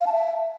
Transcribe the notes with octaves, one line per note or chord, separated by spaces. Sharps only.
F5
A5
E5